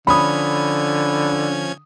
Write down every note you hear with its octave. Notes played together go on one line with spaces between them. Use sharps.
D3 F3 C#4 B5 D#6 G#6